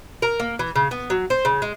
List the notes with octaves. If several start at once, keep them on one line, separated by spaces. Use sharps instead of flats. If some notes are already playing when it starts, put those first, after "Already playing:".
A#4
A#3
E3
C#3
B3
F#3
C5
C#3
G#3